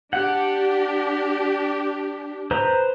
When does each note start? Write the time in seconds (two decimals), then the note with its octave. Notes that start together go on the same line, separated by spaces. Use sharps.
0.13 D4 G4 F#5
2.51 B4 C5 A#5